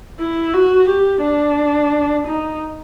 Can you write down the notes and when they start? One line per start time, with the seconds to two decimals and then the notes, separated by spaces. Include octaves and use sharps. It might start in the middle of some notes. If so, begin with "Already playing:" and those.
0.20 E4
0.54 F#4
0.88 G4
1.23 D4
2.27 D#4